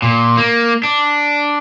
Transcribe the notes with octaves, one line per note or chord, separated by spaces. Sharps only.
A#2
A#3
D4